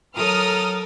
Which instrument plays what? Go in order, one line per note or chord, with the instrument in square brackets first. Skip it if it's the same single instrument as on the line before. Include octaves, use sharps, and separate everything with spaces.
[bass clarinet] F#3 [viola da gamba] A4 A#4 [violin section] D#6 F6